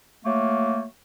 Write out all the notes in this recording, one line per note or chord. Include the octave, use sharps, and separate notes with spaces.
F#3 A3 A#3